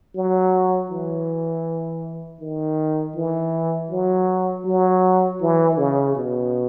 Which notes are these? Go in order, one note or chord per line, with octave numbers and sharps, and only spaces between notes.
F#3
E3
D#3
E3
F#3
F#3
E3
C#3
B2